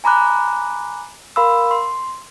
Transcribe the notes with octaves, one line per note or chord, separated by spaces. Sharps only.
G#5 A#5 B5 D6 F#6
A#4 F5 B5 C6 E6
C6